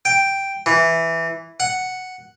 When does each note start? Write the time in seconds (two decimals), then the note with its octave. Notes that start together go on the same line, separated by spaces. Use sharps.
0.05 G5
0.66 E3
1.60 F#5